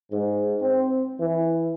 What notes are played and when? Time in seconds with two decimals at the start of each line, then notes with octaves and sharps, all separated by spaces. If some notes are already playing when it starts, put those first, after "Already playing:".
0.11 G#2
0.60 C4
1.19 E3